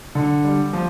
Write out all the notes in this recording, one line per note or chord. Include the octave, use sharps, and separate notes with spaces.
D3
G3
F3